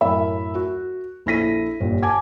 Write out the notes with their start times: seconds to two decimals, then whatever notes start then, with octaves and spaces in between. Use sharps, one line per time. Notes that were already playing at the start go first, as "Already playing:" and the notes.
0.01 F#2 A2 A#4 E5 B5
0.55 F#4
1.26 A#1 E4 A4 A#6 B6 D#7
1.80 G1 A#2 G3
2.03 G#5 A5 D6 G#6